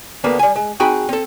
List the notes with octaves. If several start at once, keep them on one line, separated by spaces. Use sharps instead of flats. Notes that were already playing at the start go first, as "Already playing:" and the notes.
D2 D3 A#3 B3
G3 G#5
G#3
C4 D#4 F#4 G#4 G5 B5
C4 A4